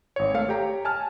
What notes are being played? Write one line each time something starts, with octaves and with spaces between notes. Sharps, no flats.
G#1 C#5
A3 F5 C#7
G4 C#5 G5 A#5
G#5 A5 F6